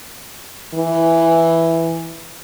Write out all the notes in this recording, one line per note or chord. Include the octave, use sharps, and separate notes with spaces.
E3